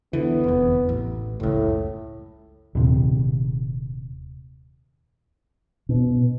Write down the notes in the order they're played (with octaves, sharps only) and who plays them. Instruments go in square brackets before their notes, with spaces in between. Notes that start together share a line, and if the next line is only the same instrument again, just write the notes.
[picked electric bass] D3 E3 [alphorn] B3
[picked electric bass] F1 E2
A1
[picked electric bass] F#1 C#2 [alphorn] A2
[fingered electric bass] D#1 C3
B2